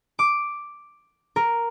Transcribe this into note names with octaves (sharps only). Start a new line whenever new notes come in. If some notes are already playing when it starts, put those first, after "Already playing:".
D6
A#4